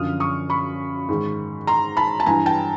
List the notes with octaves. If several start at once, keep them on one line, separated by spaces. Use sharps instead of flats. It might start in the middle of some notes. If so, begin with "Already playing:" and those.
Already playing: F#2 D3 F3 D#6 F6
C#6 D#6
B5 C#6
G#2 D#3
A#5 C6
A5 B5
A5
G2 E3 G#5 A#5
G5 A5